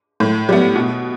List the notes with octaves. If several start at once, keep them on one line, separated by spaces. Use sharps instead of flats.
A2
G3 B3
B2